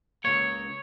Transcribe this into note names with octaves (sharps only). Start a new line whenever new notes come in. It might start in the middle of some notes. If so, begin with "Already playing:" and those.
C#2 B2 A#3 C#5